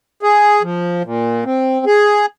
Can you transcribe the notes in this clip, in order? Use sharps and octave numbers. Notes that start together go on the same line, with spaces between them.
G#4
F3
A#2
C4
G#4